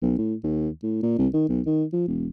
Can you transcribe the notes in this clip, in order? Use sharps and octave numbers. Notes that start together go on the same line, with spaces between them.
B1
A2
D#2
A2
A#2
C2
D#3
B1
D#3
F3
E1